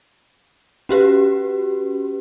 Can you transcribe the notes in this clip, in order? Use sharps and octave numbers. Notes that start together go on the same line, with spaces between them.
C#4 F#4 G4 B4